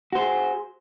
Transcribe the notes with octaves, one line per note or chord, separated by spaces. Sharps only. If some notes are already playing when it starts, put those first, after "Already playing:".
F#4 G#4 C5